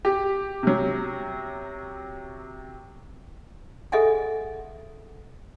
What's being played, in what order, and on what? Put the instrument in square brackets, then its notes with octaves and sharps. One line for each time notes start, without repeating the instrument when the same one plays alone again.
[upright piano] G4
C3 F#3
[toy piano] G#4 A4 D#5 E5 F#5 G#5